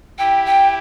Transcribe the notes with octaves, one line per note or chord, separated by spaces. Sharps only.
E4 G4 G5
G5